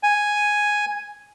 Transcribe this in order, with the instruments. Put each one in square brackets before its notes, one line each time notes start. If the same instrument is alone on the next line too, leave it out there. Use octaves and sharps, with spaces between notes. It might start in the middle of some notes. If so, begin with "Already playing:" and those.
[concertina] G#5